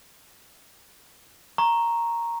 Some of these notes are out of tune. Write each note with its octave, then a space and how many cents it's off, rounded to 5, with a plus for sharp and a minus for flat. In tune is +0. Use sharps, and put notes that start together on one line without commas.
A#5 +0 C#6 -15